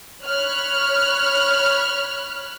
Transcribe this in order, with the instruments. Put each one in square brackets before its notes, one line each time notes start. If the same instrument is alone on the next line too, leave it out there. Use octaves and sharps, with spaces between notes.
[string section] C#5 B5 F6 F#6